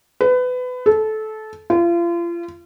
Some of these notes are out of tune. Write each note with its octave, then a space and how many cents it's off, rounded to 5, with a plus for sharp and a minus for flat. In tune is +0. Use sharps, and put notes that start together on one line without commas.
B4 +25
A4 -20
F4 -35